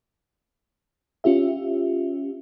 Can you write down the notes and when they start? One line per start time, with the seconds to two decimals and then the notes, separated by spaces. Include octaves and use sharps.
1.24 C#4 F4 G4 E5